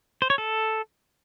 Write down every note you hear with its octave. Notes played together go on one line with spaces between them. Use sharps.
C5
C#5
A4